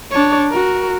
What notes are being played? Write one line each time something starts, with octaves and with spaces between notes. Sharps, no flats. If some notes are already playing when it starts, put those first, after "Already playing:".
D4 C#5
F#4 A#4